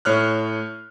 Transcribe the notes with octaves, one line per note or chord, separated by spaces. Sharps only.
A2 C#5 F6 F#6